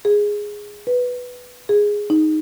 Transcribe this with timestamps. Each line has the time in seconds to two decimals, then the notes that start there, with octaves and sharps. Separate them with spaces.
0.05 G#4
0.87 B4
1.69 G#4
2.10 D#4